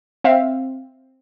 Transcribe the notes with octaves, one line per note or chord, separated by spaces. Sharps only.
C4 E5 F5